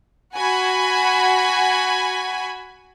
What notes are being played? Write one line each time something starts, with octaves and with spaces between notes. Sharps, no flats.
F#4 G#5 B5